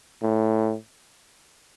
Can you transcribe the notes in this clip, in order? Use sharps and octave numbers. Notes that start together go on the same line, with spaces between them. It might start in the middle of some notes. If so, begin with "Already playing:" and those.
A2